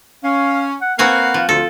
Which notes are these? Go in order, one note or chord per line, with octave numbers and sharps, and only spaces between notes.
C#4 F5
F#5
A#3 C4 F#4 B4 F5 F#5 G#5
F3
D2 F4 A4